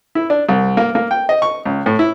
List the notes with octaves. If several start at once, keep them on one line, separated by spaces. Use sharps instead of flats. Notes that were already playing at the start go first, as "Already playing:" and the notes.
E4
D4
C2
A#3
A#3
G5
D#5
C#6
C#2
A2
E4